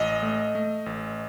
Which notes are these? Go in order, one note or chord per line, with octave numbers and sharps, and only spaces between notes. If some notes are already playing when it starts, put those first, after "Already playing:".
Already playing: A1 D#5
A3
A3
A1